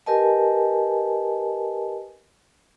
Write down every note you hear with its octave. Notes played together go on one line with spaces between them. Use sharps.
G4 A#4 B4 D#5 G#5 A5